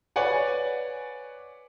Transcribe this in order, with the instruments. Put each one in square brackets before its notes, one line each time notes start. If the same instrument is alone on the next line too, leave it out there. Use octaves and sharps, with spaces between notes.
[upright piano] B4 C#5 D5 F#5 G#5